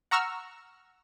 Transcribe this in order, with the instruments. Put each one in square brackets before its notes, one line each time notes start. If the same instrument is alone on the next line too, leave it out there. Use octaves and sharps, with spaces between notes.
[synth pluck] F#5 A#5 C#6 E6 F6